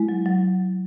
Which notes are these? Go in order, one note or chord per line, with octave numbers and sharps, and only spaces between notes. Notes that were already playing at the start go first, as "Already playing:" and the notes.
Already playing: G#3 E4
F#3
F#3